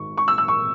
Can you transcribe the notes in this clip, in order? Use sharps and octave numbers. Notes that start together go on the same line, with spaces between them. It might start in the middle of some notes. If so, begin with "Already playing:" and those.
Already playing: G#1 G#2 C#6
C#6
E6
E6
C#6